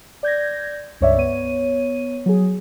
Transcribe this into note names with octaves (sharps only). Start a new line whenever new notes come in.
D5 G6 G#6 A#6
C#2 G2 C#5 D5 E5
B3 C#5 D#7
F#3 G#4